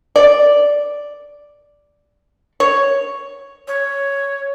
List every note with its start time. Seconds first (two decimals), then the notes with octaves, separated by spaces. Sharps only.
0.16 D5
2.60 C#5
3.68 C#5